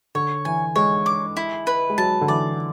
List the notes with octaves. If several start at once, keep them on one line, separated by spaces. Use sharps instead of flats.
D3 C#5
E3 G#5
G#3 C#5
D6
E4
B4
G#3
F#3 A5
D3
E3 D5